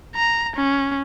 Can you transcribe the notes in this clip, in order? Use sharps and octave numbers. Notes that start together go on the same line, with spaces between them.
A#5
C#4